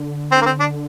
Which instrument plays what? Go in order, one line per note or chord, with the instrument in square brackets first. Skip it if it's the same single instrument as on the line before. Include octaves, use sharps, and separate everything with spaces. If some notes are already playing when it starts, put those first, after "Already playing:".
Already playing: [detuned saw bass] D3
[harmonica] C4
A#3
C4
D4